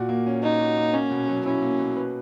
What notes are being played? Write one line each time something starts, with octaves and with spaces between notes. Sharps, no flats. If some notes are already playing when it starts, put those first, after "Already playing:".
Already playing: A#2 F#4
A#3
C#4
D#4 C#5
F#4
A#3
A#3 C#4
B2
F#3
C#4 E4
A#3
B2
B4